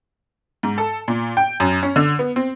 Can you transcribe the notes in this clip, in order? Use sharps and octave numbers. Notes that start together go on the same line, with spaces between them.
G#2
A4
A#2
G5
F#2
C#4
D3
B3
C4